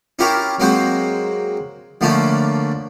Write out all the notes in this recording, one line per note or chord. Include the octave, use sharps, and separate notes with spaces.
C#4 E4 F4 G4 A#4 C#5
F#3 G#3 A#3 C4 F#4 C5
D3 F3 A3 A#3 C#4 D4